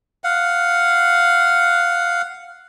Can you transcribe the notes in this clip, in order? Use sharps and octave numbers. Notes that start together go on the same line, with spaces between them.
F5 F#5